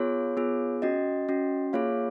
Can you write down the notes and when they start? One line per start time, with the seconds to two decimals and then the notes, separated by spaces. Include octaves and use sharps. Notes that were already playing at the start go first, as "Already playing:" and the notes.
Already playing: B3 F4 G#4 C#5
0.37 B3 F4 G#4
0.82 C#4 F#4 D#5
1.29 C#4 F#4
1.73 A#3 F4 G#4 C#5 F5